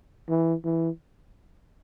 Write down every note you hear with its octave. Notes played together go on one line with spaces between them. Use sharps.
E3
E3